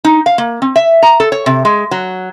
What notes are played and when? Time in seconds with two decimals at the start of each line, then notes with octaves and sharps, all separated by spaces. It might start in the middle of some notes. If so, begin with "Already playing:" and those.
0.04 D#4
0.26 F5
0.38 A#3
0.62 C4
0.76 E5
1.03 A#5
1.20 A4
1.32 C#5
1.46 C3
1.65 G#3
1.91 F#3